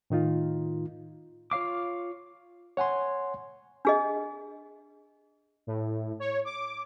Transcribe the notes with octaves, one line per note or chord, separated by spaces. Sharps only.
A2 D#3 D#4 F4
F4 C#5 F5 D6
C#5 F#5 G#5 C6
D4 G#4 D#5
A2
C#5
D6